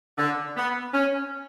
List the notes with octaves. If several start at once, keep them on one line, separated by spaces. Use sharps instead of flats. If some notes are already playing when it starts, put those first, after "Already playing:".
D3
B3
C#4